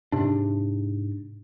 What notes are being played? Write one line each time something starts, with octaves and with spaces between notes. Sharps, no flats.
G#2 C3 D4